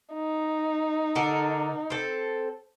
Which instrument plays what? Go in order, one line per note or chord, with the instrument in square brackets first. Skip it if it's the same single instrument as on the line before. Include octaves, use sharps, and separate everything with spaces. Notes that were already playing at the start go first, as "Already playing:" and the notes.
[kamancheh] D#4
[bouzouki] D3 A4 A#4
C4 A4